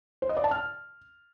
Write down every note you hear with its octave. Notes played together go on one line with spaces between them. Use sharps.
C5
D#5
D5
A5
F6